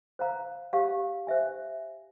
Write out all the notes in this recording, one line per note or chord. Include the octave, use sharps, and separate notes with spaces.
C5 F5 A#5
G4 C5 F5
C5 E5 G#5